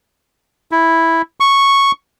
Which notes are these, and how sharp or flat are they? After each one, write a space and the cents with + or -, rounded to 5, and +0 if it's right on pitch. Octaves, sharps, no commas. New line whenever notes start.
E4 -5
C#6 -5